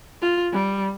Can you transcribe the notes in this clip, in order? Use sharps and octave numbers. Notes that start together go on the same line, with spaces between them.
F4
G3